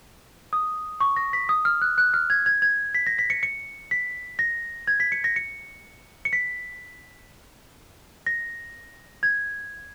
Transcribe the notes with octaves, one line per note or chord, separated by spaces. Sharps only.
D#6
C#6
A#6
B6
D#6
F6
F#6
F#6
F6
G#6
G#6
G#6
B6
A#6
B6
C#7
C#7
B6
A#6
G#6
B6
C#7
A#6
C#7
C#7
B6
A#6
G#6